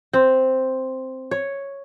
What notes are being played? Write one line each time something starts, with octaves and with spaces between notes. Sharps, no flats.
C4
C#5